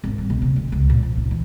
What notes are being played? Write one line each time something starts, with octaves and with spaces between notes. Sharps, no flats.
G#1
G3
B1
C3
D2
C#2
A#2
F3
D#4
E3